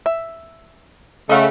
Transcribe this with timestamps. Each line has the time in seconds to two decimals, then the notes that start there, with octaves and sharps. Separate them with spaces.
0.06 E5
1.29 C#3 A3 D#5 F5 F#5